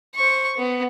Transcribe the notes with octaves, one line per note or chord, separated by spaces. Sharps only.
C5 C#6
B3